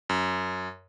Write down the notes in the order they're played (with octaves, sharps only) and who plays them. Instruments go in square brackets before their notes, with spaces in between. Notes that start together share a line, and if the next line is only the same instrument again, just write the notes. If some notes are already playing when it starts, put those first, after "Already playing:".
[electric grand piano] F#2